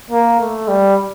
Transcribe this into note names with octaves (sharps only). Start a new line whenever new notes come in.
A#3
A3
G3